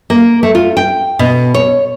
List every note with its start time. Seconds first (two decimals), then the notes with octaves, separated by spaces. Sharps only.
0.10 A#3
0.43 A3
0.55 F4
0.77 G5
1.19 B2
1.54 C#5